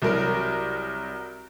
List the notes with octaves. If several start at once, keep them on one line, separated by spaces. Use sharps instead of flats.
C2 F#3 A#4